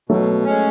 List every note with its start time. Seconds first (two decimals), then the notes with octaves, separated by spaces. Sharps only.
0.09 B2 F#3 A3
0.44 G#3 C#4